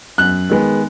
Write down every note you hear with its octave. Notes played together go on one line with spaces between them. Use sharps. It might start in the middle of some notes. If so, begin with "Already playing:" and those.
F#2 F#6
D#3 G#3 B3